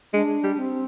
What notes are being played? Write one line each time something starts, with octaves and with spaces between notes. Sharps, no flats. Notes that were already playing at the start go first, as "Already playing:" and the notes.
G#3 D4
G3
C4